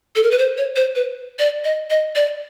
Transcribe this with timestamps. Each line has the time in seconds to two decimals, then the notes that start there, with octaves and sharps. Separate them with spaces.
0.16 A4
0.23 A#4
0.31 B4
0.38 C5
0.58 C#5
0.76 C5
0.96 B4
1.39 D5
1.65 D#5
1.90 D#5
2.16 D5